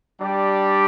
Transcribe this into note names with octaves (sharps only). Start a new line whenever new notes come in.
G3 D4 G4